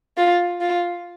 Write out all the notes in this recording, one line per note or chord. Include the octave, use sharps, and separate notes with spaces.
F4
F4